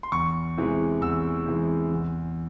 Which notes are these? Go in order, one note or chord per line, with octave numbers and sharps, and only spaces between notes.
C6
E2 C#6
C3 E3 G#3
E2 E6
C3 E3 G#3
E2